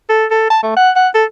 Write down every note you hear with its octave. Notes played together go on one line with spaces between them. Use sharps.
A4
A4
A5
A3
F#5
F#5
A4